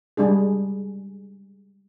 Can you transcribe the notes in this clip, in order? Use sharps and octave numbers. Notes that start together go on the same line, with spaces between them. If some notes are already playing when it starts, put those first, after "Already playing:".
G3 G#3 D4 G#4